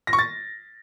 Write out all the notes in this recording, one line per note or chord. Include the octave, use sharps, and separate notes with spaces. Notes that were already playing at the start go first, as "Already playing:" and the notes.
A#6
C#6
A6